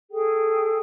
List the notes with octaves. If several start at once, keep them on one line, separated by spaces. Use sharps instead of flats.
G#4 A4 G5